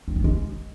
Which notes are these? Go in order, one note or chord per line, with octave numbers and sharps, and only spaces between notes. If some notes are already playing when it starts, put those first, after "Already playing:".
C4
B3
G#3